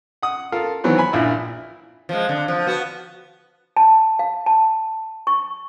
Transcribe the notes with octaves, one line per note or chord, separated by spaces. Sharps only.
F#5 D#6
F4 A4 A#4 F5
D#3 E3 F#3 B3 C4
G#5 B5
A#1 A#2 E4 E5
F3 G#3
D3
F3
B3 F#4
A5
F5
A5
C#6